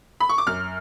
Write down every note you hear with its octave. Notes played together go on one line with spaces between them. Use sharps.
B5
C#6
D6
F#2 F6